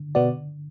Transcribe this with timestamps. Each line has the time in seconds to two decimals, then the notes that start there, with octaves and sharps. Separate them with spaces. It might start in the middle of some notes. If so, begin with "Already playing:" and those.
Already playing: D3
0.15 B2 B3 F#4 D5